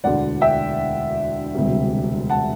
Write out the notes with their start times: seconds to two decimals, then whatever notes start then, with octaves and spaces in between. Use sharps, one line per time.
0.04 E1 D2 D3 D5 F#5
0.41 E5 G5
1.55 E1 D2 C3 G3
2.29 F#5 A5